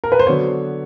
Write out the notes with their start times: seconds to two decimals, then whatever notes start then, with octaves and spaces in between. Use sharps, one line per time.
0.04 A#4
0.12 B4
0.20 C5
0.27 D3 F#3 B3 C#5